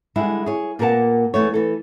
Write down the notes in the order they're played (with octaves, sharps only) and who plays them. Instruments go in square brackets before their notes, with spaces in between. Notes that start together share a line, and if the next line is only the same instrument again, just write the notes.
[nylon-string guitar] D3 G3 G#3 E4 G#4
G#4 C#5
A#2 A#3 B3 A#4 F#5 A5
E2 A#2 A3 C#5
E3 A4